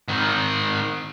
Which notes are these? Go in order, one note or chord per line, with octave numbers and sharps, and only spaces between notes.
G#2 D#3